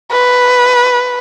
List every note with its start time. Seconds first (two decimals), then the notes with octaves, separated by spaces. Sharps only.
0.12 B4